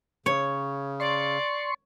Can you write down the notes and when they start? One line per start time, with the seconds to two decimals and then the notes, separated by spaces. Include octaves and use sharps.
0.26 C#3 C#5
1.00 D5 C6 C#6